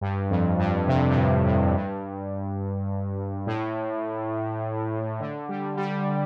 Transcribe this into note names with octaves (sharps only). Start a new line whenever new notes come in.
G2
F2
G2
C3
G2
A2
A2
G2
A2
D3
G3
G3